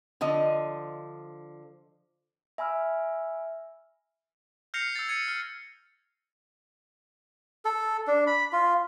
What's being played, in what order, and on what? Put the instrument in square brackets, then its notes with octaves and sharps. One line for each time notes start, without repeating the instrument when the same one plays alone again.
[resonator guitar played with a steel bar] D3 F3 D#5
[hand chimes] E5 G#5 B5 E6 F6
[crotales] F6 G6 A#6 C7 C#7 F7
E6 G6 A6
E6 G#6 C#7 D#7
F6
[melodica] A4
D4
B5
F4